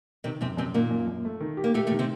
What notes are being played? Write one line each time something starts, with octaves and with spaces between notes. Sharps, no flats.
C3 D#3 C4
F#2 C3 C4
F#2 C3 C4
A#2 D#3 A#3
F#2
F#2
A3
D#3
G4
A#3
A2 A3 G4
A2 A3
D#3
C3 C4